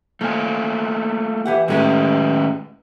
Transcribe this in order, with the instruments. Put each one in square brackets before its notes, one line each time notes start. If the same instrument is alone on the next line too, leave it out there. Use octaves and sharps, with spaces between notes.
[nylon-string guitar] F3 [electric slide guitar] A3 A#3 G#5
[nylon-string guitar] E3 G4 F#5
[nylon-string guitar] A2 G#3 G4 [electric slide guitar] D#3 C#4 B4